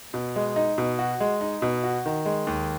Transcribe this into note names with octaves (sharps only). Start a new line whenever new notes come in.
B2
G#3
D#4
B2
F#4
G#3
D#4
B2
F#4
D#3
G#3
D#2